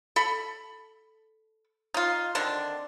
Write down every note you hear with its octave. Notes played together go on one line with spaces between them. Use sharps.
A4 B5
D#4 F4
D3 D#3 C4 D4